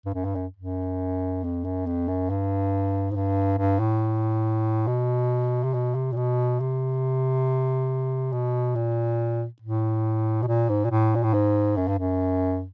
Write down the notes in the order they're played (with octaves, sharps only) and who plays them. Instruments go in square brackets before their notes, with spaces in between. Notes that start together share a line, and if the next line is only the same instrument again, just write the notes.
[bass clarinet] G2
F#2
G2
F#2
F#2
F2
F#2
F2
F#2
G2
G#2
G2
G2
A2
B2
C3
B2
C3
A#2
B2
C3
B2
A#2
A2
B2
A#2
G#2
A#2
A2
A#2
A2
G#2
F#2
G2
F#2